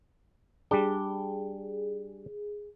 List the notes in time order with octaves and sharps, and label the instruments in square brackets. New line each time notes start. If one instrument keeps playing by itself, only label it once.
[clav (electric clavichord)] G3 D4 [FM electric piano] G#4